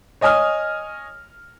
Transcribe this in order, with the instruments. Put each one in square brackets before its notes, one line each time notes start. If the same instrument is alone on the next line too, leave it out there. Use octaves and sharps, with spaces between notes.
[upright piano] C#5 D#5 G#5 D#6 F6